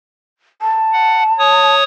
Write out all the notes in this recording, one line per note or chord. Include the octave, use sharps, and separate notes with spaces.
A5
F#5
C#5 D#6